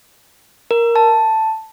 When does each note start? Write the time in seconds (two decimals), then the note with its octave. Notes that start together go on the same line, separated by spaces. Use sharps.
0.71 A#4
0.96 A5